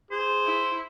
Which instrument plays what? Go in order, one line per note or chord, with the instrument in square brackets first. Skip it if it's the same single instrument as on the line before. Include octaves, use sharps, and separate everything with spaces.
[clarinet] G#4 [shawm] C5
[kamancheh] E4